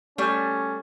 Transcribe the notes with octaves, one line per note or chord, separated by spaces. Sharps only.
G3 A3 C#4